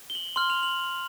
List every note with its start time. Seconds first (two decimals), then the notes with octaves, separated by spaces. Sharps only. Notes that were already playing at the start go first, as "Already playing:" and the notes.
0.10 G7
0.15 F#7
0.36 C6 F6 F#7
0.50 F7
0.63 F#7